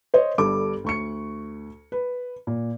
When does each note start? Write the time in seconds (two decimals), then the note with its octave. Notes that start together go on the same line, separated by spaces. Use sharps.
0.14 C5 C#5 D#5
0.38 G1 G2 A4 D6
0.84 D2 C#6 C#7
1.92 B4
2.47 A#2